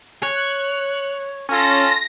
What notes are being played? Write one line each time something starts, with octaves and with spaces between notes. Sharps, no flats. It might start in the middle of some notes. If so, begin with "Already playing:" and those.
C#5 F#6
C#4 F4 A4 A#6